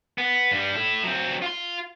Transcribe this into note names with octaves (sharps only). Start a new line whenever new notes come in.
B3
G2 G3
E4 A4
F#3 C4
F4 C6